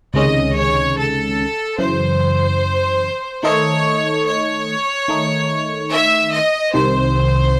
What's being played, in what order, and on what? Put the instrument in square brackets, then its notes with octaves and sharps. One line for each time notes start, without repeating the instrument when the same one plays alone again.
[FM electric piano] C#2 C3 D#3 G#3 C#4 [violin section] D#5
[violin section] C#5
A4
[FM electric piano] F#2 C#3 E3 [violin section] C5
[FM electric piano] D#3 A3 D#4 A4 D#5 [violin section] C#5
[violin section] C#5
[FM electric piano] D#3 A3 D#4
[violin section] E5
D#5
[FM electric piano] C2 C3 D#3 [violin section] C5